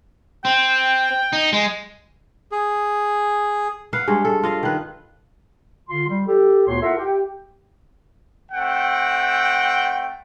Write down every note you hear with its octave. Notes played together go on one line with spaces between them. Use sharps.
C4 G5
D#4
G#3
G#4
B4 F5 F#5
G2 G#3 C#5
A4
F4 D#5 F5
D#3 B4
D3 F4 C6
G3
G4 A4
D2 A#2 B3 C#5 C6
E4 F4 A4 A#4 E5 F#5
G4 G5
A3 C4 F#5 G5